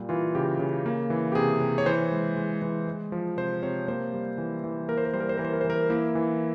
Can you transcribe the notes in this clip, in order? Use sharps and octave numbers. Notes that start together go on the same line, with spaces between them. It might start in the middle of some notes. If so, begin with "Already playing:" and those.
Already playing: A#2 G3
E3 F4
C#3 G4
C#3
A#3
E3
G4
C3 G#4
C3
C#5
E3 C5
G#3
G#3
E3
G#3
F3
C3 C5
C3 C#5
A#3 C5
G3
E3
E3
A#3 A#4
C5
A#4
G3 C5
A#4
C5
E3 A#4
C5
A#4
C5
E3
A#4
A#3 E4
E3